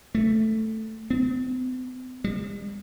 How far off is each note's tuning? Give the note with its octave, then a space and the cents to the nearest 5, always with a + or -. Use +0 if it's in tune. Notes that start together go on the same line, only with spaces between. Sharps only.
A3 +0
C4 -45
G3 +45